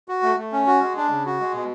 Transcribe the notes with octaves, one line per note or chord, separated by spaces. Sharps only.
F#4
A3
A3
C#4
F#4
G#3
D4
C#3
F#4
G#3
B2